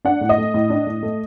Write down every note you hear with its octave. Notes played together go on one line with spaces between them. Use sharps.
D4 F#5
A2
D#5
A3
A2
D4
A2
A3